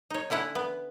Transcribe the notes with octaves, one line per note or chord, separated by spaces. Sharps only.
D#4 C#5
D3 C#4 E4 F#5
B3